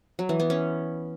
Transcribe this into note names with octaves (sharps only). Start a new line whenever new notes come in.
F#3
E3
B3
C#4